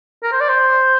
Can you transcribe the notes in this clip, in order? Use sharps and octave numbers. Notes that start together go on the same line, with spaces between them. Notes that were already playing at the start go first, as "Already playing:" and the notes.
A#4
C5
D5
C5